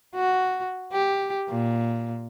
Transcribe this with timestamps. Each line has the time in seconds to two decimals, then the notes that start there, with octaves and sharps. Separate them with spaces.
0.15 F#4
0.92 G4
1.49 A#2